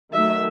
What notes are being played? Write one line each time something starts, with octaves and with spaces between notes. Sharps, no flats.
D#3 F#3 A3 E5